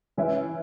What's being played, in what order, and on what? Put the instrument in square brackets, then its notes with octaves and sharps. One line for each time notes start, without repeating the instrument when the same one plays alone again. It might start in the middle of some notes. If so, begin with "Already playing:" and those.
[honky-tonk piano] E3 C#4 E4 B4 E5